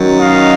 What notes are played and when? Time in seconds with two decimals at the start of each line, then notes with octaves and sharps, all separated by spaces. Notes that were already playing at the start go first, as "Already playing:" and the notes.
Already playing: F#2 D#3 F#3
0.20 D#5 F5